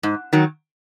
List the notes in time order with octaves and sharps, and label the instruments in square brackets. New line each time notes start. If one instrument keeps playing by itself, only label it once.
[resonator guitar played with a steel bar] G#2
D#3 F#3